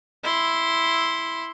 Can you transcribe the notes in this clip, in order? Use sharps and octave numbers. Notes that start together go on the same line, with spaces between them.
E4 C6